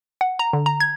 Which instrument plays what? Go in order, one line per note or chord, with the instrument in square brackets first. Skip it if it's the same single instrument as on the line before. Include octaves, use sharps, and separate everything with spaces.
[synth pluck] F#5
A#5
D3
A#5
G#6